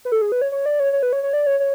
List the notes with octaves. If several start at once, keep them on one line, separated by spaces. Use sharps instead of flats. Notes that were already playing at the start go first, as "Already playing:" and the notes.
B4
A4
G#4
B4
C#5
C#5
D5
C#5
C#5
B4
C#5
C#5
D5
C#5
C#5